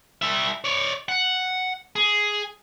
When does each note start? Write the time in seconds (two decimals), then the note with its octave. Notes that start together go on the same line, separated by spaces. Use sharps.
0.22 G3 E5
0.64 C#5 D5
1.09 F#5
1.96 G#4